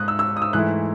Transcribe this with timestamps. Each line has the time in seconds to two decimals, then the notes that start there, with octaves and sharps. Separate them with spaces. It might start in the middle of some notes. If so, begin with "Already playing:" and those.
Already playing: G#2 D#6 F#6
0.08 E6
0.19 E6
0.37 D#6
0.42 E6
0.53 G#2 E3 A3 E4 F#6